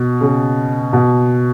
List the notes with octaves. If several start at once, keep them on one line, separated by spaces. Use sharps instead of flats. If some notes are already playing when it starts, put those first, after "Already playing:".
Already playing: B2
C#3
B2